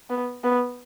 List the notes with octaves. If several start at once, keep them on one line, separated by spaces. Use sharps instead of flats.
B3
B3